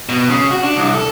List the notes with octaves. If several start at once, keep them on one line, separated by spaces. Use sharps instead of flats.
B2
C#3
F#4
D4
C2
A4